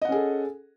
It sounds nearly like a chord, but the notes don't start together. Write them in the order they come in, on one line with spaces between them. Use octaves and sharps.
D#5 F#5 C#4 G#4 A4